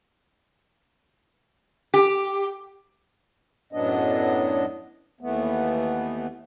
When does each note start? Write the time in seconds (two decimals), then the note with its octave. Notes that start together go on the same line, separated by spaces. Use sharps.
1.94 G4
3.73 F#2 A2 F#3 B3 D4 D#5
5.21 D#2 E3 A3 B3